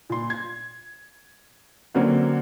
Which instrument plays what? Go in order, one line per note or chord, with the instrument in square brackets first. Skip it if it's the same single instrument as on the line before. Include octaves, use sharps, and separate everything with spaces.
[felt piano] A#2 C6
G#6
D3 F#3 A#3 C4 C#4 F#4